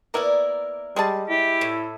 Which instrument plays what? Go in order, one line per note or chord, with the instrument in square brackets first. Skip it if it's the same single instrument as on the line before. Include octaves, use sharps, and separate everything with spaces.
[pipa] A#3 B3 E4 [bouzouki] A#4 D5
[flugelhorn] G3 [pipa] G#3 G#4 A5
[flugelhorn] E4 [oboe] G4
[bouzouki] A2